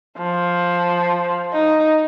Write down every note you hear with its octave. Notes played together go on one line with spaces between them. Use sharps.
F3
D#4